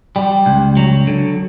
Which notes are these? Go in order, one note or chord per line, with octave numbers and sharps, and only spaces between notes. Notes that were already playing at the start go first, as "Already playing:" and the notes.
G3
C#2
F#3
D3